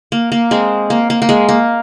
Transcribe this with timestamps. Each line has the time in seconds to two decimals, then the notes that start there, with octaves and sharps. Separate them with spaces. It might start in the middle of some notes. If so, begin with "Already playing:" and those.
0.12 A#3
0.32 A#3
0.51 G#3 C4
0.90 A#3
1.10 A#3
1.22 A#3
1.29 G#3
1.49 A#3